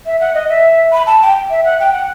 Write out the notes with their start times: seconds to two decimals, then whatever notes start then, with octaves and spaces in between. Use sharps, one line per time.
0.06 E5
0.20 F#5
0.34 D#5
0.49 E5
0.92 B5
1.06 A5
1.22 G5
1.50 E5
1.64 F#5
1.80 G5
1.93 F#5